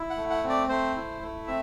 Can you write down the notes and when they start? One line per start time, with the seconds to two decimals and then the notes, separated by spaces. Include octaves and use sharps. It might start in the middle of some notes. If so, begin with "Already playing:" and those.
Already playing: E4
0.10 F#5
0.17 A3
0.30 F#5
0.43 C4
0.49 D5
0.69 A3 C5
0.96 E4
1.22 A3
1.47 C4 E5